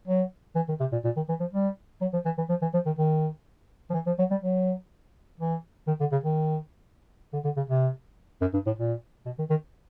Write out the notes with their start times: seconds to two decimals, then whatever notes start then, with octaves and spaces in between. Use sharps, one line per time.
0.08 F#3
0.55 E3
0.69 D#3
0.80 C3
0.92 A#2
1.04 A#2
1.16 D#3
1.29 E3
1.40 F3
1.53 G3
2.01 F#3
2.13 F3
2.25 E3
2.38 E3
2.49 F3
2.62 E3
2.73 F3
2.86 D#3
2.98 D#3
3.90 F3
3.94 E3
4.06 F3
4.19 F#3
4.31 G3
4.43 F#3
5.40 E3
5.87 D#3
6.00 D3
6.12 C#3
6.24 D#3
7.33 D3
7.44 D3
7.56 C#3
7.70 C3
8.41 F#2
8.53 G2
8.66 A2
8.78 A#2
9.26 B2
9.39 D#3
9.50 D#3